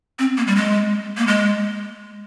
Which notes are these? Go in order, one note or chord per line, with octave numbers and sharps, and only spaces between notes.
C4
A#3
G3
G#3
A#3
G#3